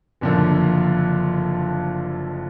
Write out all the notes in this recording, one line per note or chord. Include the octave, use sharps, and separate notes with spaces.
F#1 F2 D3 F3 A#3